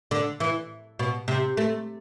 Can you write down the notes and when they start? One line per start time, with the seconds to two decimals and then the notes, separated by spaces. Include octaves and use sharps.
0.11 D3
0.40 E3
0.99 B2
1.28 C3
1.57 A3